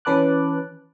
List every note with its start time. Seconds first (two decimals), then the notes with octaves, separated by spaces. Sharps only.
0.05 E3 C#4 B4 A5 D6 F#6